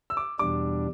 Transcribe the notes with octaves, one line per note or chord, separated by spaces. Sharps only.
E6
D6
E2 B2 G3 D4 D6